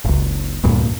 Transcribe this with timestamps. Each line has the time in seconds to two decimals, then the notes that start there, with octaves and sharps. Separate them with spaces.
0.05 F#1 C#2
0.64 D2 G2 A#2